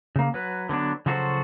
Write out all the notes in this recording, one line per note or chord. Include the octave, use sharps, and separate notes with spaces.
C#3 A#3
F#3 B4
D3 F#3 B3 D4
C#3 F3 F#3 F#4 A4 C5